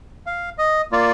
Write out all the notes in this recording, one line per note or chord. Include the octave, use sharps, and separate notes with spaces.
F5
D#5
A#3 F4 D5